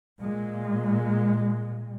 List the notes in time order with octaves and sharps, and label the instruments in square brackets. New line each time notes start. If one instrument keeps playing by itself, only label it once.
[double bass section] A#2 G#3